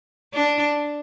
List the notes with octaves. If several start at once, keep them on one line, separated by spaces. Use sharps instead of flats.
D4